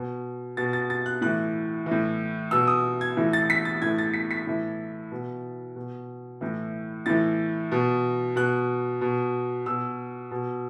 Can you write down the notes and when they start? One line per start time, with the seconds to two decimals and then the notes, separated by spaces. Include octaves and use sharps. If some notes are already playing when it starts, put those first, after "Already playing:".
Already playing: B2
0.57 B2 A6
0.73 A6
0.90 A6
1.06 F#6
1.21 A2 E3 F#6
1.86 A2 E3
2.51 B2 E6
2.67 D#6
3.01 G#6
3.17 A2 E3
3.33 A6
3.50 B6
3.65 A6
3.82 A2 E3 G#6
3.98 A6
4.13 B6
4.31 B6
4.47 A2 E3
5.12 B2
5.76 B2
6.41 A2 E3
7.06 A2 E3 A6
7.72 B2
8.36 B2 F#6
9.01 B2
9.66 B2 E6
10.31 B2